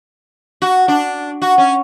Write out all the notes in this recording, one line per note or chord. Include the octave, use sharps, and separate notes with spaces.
F#4
D4
F#4
C#4